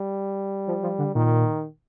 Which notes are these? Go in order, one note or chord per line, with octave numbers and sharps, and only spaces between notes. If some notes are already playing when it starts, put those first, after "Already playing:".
Already playing: G3
F3
F3
D3
A#2 D#3